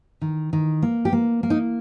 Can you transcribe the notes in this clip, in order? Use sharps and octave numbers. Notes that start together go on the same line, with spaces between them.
D#3
D#3
A#3
G4
A#3
A#3
D#4